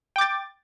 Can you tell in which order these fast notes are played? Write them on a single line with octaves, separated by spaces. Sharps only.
G5 D6 A6